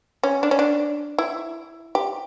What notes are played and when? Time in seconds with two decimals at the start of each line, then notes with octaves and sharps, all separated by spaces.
0.23 C#4
0.43 D4
0.51 C#4
0.59 D4
1.18 E4
1.95 G4